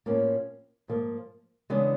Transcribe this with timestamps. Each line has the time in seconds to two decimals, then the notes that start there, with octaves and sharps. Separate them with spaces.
0.06 A2 F3 A#3 C#4
0.88 G#2 F3 A#3
1.70 C#3 E3 G#3 B3 D4